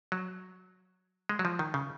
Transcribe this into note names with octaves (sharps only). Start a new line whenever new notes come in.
F#3
G#3
F#3
F3
D#3
C#3